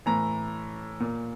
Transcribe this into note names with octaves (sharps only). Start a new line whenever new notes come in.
A2 E3 A#5
A#2